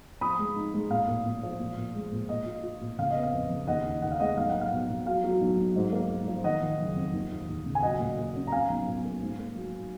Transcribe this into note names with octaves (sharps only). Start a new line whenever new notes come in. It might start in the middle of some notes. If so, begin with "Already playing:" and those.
F3 B5 D#6
G#3
D#4
G#3
A#2 F5
A#2
A#2
F3
A#2
A#2
G#3
A#2
A#2 D#5
F4
F4
A#2
C#3 F5
D#5
B3
F5
F2
C#3
D#2 D#5 F#5
D#2
D#2 F#5
F5
G#3 D#5 F#5
B1 F5
A#3 F#5
F5
B2
B2
F#3 F5
F#3
B1
B1
G#2
A#3
G#2
F3
D#3 D#5 F#5
D#3
F#1
F2
D#2
F3
D#2
C#3
G#5
F#3 D#5 F#5
A#2
A#2
C#4
A#5
C#4 F5 G#5
B1
B2
A#3
G#2
A#3
F#3